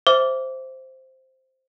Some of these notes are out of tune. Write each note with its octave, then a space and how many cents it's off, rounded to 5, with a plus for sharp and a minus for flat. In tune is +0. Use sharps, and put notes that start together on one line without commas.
C5 +0 E5 +0 D6 -20